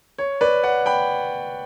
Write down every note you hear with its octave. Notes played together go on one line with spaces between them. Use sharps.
C#5
B4 D5
D5 F#5
G5 B5